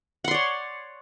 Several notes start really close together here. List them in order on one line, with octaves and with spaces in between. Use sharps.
F#5 C6 D5 C#5